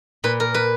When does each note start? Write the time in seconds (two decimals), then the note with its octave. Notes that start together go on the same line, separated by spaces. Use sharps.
0.24 A#2 B4
0.40 A#4
0.54 B4